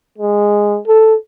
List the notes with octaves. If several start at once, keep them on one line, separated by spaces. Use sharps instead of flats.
G#3
A4